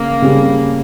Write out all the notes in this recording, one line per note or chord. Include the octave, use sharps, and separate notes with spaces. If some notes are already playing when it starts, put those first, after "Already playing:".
Already playing: C#3 A#3 C#4
C#3 G3 C#4 G#4